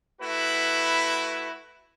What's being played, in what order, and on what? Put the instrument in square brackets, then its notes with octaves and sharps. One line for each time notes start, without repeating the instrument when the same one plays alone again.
[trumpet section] A3 E4 F#4 B4